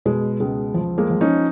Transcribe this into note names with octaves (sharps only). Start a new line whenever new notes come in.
B2 G#3
C#2 G#3
F3
G#3 A#3
F3
C#4 D#4